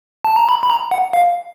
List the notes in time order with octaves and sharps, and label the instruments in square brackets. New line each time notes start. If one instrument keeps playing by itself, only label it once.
[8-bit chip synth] A5
A#5
B5
B5
A#5
F#5
F5